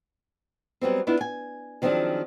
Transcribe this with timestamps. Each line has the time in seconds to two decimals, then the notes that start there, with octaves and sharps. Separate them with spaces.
0.81 F#3 G3 B3 C4
1.07 B3 D4 E4 F4
1.21 G#5
1.82 D#3 F3 F#3 C4 D4 G#4